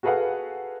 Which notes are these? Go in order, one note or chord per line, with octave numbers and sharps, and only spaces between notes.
F#4 G#4 A4 B4 F5 F#5